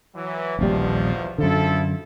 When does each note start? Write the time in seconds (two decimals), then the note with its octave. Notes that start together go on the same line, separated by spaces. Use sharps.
0.14 E3 F#3
0.59 D#1 A#1 E2 B2 F3 G3
1.38 F#2 D3 F3 E4 A4